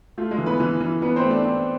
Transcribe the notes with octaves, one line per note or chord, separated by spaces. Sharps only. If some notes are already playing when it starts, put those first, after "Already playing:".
A3 F4
G#3 G#4
E3
B3 B4
E3
E3
E3 B3 B4
C4 C5
A3
D4 D5
C4